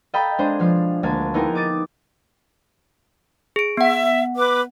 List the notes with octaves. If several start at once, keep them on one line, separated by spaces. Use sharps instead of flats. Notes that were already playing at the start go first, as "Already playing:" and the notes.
A4 D#5 F5 G5 A#5 B5
G#3 C4 D4 G#4 C5
B2 F3 F5 C7
D2 G#3 A#3 F5 A5 G#6
B3 D#4 E4 G4 G#4 A#4
D6 D#6 A6 D7 D#7
G#4 D7
B3 E5 F#5
B4 D6